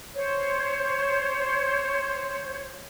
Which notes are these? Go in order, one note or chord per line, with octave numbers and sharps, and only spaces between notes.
C5 C#5